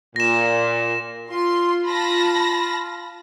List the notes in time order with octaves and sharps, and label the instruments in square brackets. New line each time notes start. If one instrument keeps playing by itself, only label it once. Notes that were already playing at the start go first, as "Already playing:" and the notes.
[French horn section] A#2 [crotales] A#6 E7
[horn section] F4 [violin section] C6
[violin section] A5 B5 A#6